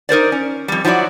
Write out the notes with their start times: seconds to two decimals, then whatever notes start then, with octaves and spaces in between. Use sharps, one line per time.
0.09 D#4 A#4 C5 D5
0.32 C#4
0.68 F2 G3
0.85 F3 F#3 E4 F#4 D5